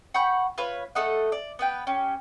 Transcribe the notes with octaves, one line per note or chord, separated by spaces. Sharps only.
F#5 B5 C#6 G6
F4 B4 C#5
A3 A4 D#5 F#5
D5
B3 B4 G5
C#4 G4